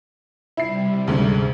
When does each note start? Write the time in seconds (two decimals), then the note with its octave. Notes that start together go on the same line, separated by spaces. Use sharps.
0.57 C3 G3 E4 C7
1.08 D2 G#2 C#3